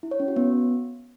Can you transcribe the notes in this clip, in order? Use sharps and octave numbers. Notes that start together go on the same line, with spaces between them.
E4
C#5
C#4
F#4
B3